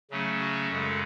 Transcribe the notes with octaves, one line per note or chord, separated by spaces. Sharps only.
C#3 F#3 A3 C#4
F#4
F#2 C#3 G#3 A4